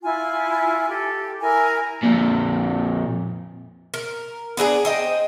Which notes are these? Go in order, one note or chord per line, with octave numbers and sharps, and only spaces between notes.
E4 F4 G#5
G4 A4
E4 A#4 G#5
F2 A#2
A#4
B3 D4 G#4 A#5
C5 D#5 G5